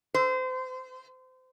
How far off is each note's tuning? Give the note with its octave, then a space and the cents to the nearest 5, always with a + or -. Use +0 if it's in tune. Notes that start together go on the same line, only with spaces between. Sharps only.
C5 -30